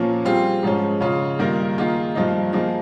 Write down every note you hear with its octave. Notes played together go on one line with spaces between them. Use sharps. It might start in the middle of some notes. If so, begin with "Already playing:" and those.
Already playing: A#2 F3 A#3 C#4
G3 C4 F4 G#4
G#2 F3 G#3 C#4
C#3 G#3 C#4 F4
G2 D#3 A#3 F4 A#4
D#3 A#3 F4 G#4
G2 F3 A#3 D#4
F3 A#3 D#4 G#4